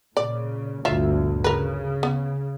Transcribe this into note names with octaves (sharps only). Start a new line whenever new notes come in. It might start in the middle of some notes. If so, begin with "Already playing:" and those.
A#2 C#3 D5
G1 D2 A#2 F4 E5
C#3 A#4 B4
B3